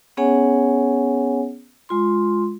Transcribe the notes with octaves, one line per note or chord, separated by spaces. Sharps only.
B3 C#4 G#4 C#5 F#5 G#5
G#3 F4 C6